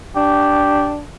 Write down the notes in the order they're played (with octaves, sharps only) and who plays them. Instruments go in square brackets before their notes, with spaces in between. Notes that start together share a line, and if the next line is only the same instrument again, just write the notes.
[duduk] D4 [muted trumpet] G4